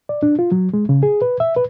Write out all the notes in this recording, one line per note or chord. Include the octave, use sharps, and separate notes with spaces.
D5
D4
F4
F#3
G#3
C#3
G#4
B4
E5
B4